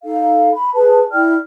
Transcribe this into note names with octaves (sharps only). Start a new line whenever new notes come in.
D#4 A4 F5
B5
G#4 B4 A5
E4 D5 G5 F6